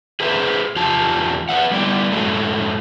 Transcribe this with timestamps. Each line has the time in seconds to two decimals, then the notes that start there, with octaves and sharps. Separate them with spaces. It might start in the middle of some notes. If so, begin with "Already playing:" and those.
0.20 G#4 B4 C5 D#5 E5
0.76 E2 F4 G4 A5
1.49 B4 C5 E5 F#5
1.71 G3 B3 E4 D5
2.12 F#2 A2 F#3 G#3 A3